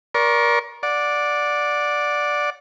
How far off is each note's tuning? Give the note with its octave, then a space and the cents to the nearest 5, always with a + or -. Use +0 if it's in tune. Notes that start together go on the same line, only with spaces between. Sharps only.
A#4 +25 D5 -20 C#6 -35
D5 +0 F#5 -20